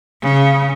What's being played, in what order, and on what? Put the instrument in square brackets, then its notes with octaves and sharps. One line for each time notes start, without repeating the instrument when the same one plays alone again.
[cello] C#3